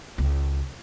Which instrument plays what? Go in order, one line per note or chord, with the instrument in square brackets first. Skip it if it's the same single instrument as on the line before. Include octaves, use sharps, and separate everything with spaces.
[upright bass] C#2